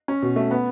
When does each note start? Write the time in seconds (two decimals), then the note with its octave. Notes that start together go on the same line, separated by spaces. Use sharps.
0.08 C#4
0.22 B2
0.36 A3
0.51 B3